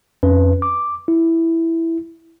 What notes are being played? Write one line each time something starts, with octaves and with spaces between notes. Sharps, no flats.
F2 C#4 B4
D6
E4